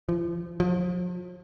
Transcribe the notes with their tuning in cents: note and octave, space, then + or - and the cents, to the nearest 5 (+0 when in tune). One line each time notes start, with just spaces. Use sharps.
F3 -30
F3 +40